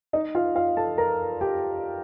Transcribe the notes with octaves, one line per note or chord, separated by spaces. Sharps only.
D#4 D#5
F4 F5
F4 F5
A4 A5
A#4 A#5
G4 G5